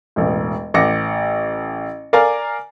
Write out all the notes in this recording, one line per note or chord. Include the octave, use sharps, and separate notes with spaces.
E1 A1
A1 F#5 D6 A#6 C#7
A#4 D5 F5 G#5 A#5